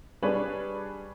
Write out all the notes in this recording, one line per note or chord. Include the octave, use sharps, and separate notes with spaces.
G3 D4 G#4 B4 C#5